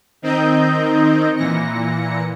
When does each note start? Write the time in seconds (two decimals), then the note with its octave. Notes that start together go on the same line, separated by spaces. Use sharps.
0.22 D#3 C4 D#4 D#5 G6
1.36 A#2 E3 A#6 C#7